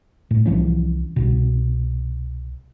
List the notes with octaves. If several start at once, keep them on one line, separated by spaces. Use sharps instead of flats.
A2
C2 E3 F3 C#4
C2 B2